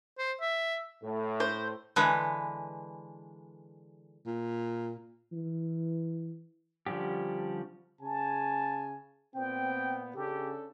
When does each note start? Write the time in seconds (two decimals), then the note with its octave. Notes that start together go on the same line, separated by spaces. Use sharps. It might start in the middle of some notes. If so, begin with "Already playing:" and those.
0.18 C5
0.41 E5
1.04 A2 A3
1.40 C5
1.96 D3 E3 G#3 B4
4.26 A#2
5.32 E3
6.86 D3 F3 G3 C#4 G4
8.01 C#3 G#5 A5
9.35 A#2 B3 C4 G5
10.15 C#3 C#4 D4 G4 A4